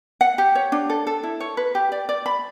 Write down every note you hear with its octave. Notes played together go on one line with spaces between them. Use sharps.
F#5
G4
C#5
D4
A4
A4
E4
C#5
B4
G4
D5
D5
B5